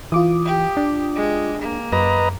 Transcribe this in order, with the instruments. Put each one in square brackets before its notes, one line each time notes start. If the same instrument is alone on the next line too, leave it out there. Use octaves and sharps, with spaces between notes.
[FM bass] E3 [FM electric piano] F4 D6 D#6
[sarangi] G4
[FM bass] D4
[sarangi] G#3
A#3
[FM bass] F#2 [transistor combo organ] B4 D#5 A#5